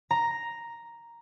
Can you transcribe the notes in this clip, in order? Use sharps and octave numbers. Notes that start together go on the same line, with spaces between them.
A#5